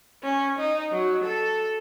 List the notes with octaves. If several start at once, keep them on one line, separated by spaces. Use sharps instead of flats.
C#4
D#4
F#3
A4